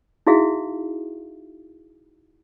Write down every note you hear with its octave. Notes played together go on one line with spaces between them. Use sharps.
D#4 E4 F#4 G#4 E5 F5